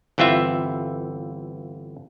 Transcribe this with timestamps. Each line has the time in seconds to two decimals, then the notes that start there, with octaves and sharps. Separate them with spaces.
0.18 G1 E3 C4 F4 E5